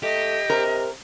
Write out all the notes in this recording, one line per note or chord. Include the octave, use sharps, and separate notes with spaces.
A3 G4 D#5
C3 A#4